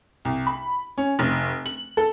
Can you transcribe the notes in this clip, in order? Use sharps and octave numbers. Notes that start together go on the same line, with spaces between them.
C2
B5
C#4
F1
F#7
A4